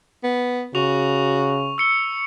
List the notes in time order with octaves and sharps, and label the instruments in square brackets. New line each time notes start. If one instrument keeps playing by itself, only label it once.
[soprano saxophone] B3
[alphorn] C#3 [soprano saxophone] F#4 [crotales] C#6 F7
[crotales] E6 C#7 G7